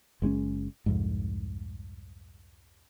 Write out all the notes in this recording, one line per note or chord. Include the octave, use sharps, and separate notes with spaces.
F#1 G#3 C4 C#4
C2 F2 G#2